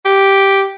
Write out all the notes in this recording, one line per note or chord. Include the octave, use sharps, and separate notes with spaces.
G4